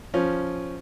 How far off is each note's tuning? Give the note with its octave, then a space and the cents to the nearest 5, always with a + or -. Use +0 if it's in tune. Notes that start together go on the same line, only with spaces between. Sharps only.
F3 +0 C#4 +0